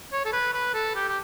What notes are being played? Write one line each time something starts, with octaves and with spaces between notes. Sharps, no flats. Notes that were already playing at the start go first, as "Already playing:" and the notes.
C#5
A4
B4
B4
A4
G4
G4